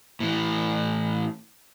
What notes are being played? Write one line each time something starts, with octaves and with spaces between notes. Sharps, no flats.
A2 E3